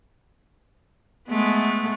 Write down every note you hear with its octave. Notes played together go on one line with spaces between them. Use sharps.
G#3 A3 B3